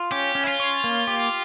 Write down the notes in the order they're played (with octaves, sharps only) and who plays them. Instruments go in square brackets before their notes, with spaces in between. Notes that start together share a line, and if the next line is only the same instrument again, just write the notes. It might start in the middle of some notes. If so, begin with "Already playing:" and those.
Already playing: [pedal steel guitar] F4
[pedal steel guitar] C#4 [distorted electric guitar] G4
[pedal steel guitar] C#4
[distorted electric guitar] E4
F4
[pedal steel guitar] C#5
A#3
G4